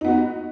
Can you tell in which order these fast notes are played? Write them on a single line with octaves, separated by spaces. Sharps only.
D#4 B3 F#4